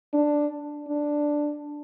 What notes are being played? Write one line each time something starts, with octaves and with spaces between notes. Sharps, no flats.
D4
D4